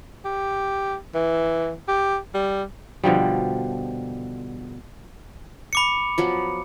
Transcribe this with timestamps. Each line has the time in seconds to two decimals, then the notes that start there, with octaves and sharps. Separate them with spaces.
0.25 G4
1.14 E3
1.88 G4
2.34 G3
3.03 B2 D3 F3 G3
5.73 B5 D6 C#7
6.18 F3 F#3 B3